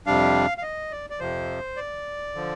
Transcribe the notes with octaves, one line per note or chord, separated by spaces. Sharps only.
F2 C3 G3 D4 F5
F5
D#5
D5
D5
F2 C3 F3 C5
D5
D3 F3